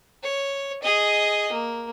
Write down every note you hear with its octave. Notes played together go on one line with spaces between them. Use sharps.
C#5
G#4 D#5
A#3